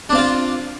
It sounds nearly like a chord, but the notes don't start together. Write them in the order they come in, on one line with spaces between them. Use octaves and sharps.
D4 C4 F5 F4